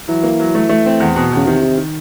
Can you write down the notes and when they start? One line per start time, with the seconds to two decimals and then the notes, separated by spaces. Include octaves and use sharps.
0.08 E3 F#3
0.24 A#3
0.40 F#3
0.55 A3
0.69 A3
0.86 C4
1.00 E2
1.16 B2
1.32 E2 C#3
1.47 C3 D#3
1.62 D#3
1.77 D#3